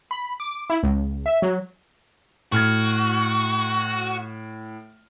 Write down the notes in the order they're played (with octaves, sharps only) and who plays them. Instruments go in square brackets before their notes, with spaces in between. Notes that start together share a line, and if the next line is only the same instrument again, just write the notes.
[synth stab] B5
D6
E4
C#2
E5
F#3
[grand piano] A2 F6 G#6 [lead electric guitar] F#4